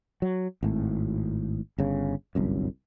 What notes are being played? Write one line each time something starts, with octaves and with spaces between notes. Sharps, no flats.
F#3
G#1 A2
G1 C#3
G1 C2 F#2